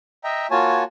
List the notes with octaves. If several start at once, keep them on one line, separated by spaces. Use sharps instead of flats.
D#5 E5 G5 A#5
A#3 F4 F#4 C#5 G#5 A5